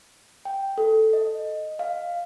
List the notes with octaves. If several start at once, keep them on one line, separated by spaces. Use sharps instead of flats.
G5
A4
D#5
F5